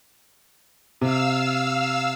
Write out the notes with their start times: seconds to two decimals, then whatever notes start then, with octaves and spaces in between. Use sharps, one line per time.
1.01 C3 F5 E6